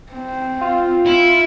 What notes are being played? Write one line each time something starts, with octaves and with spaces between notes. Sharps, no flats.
C4
F4
E4